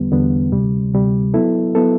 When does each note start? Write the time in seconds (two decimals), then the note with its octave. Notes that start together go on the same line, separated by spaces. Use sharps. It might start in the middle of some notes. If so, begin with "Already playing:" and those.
Already playing: E2 D3 G3 B3
0.11 E2 D3 G3 B3
0.52 D2 C3 G3
0.93 D2 C3 G3
1.34 F#3 B3 E4 A4
1.75 F#3 B3 E4 A4